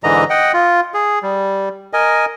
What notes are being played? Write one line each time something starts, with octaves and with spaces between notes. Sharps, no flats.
G#2 D3 E3 D#5 A#5
D#5 F#5 G5
F4
G#4
G3
A#4 D#5 G#5